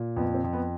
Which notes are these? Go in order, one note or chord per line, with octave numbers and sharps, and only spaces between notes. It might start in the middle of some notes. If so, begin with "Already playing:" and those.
Already playing: A#2
F2 B3
C4
F2
B3